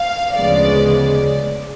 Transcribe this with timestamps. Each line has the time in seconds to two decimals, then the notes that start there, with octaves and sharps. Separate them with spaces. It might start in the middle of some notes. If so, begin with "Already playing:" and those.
Already playing: F5
0.35 D2 C#3 F3 G#3 B3 D5
0.89 D5